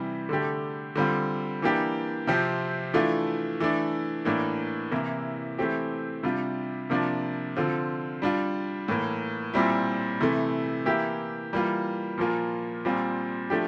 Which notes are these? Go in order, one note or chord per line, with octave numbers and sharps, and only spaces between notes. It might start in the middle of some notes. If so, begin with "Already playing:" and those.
Already playing: C3 E3 G3
D3 A3 D4 G4
D3 G3 C4 F4
E3 A#3 D4 G4
C3 F3 C4 G4
E3 A3 D4 F4
E3 A3 D4
A2 E3 A#3 D4
C3 E3 A#3 E4
E3 A3 C4 G4
C3 G3 D4 F4
C3 F3 A#3 D4 F4
D3 F3 C4 F4
G3 D4 F4
A2 E3 A#3
A#2 G3 C4 E4
C3 E3 A3
E3 A#3 E4 G4
E3 G3 A#3 F4
A#2 F3 A#3 F4
A#2 G3 C4 F4
F3 A3 D4 G4